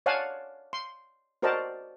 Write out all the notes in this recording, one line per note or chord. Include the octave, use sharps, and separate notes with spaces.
C#5 D5 F5 F#5 G#5 A5
C6
F#4 A#4 C5 D5 D#5 A5